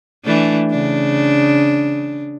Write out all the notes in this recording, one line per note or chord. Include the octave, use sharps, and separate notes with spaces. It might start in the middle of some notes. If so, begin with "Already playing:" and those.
E3 A3 D4
C#3 D4